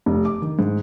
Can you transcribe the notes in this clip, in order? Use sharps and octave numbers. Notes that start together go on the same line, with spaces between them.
F1
D6
D#3
G#2